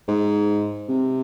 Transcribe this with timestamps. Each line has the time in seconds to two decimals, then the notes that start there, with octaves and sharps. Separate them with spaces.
0.08 G#2
0.89 C3